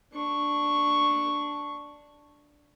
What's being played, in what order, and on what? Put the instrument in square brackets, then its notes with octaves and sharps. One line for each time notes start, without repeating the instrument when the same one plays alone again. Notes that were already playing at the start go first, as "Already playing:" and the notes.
[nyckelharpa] D4 C#6